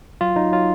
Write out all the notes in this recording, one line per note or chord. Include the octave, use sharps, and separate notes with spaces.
F#3 F4
F#3 D#4
F#3 F4